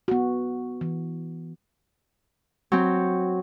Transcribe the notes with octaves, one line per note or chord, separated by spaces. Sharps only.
B3 F#4
E3
F#3 C4